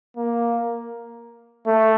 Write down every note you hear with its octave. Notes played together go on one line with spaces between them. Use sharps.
A#3
A3